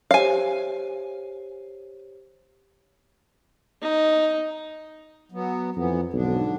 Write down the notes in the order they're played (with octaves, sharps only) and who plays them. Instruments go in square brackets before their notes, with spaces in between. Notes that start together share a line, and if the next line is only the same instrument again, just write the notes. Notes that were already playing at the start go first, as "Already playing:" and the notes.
[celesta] G4 C5 C#5 [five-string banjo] F5 G#5
[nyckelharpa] D#4
[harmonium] F#3 B3
[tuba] F2 [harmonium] E3 B3
[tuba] B1 [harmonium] G#2 D3 D4